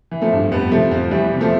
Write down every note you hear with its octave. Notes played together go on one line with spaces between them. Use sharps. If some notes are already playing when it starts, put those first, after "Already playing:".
E3
F3 A3
G2
F2 G3 B3
C3 F3 A3
F2 F3
E2 E3 G3
C3
F3 A3